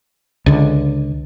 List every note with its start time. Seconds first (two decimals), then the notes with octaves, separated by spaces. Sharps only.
0.46 C#2 D3